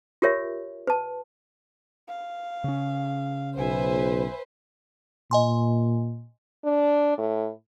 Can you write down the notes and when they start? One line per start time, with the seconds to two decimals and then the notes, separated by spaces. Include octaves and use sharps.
0.22 F4 G4 A#4 C#5 E5
0.87 B4 A5
2.08 F5
2.64 C#3 C#4
3.57 B1 B4 C5 E5 G#5
5.31 A#2 D#5 G#5 C6
6.64 D4
7.18 A2